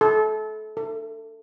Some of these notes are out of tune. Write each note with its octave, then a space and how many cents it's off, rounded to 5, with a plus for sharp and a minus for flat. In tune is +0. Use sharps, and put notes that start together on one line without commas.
A4 -30
A4 +25